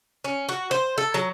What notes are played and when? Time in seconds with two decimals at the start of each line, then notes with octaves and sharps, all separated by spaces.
0.24 C#4
0.49 F#4
0.71 C5
0.98 A4
1.14 F#3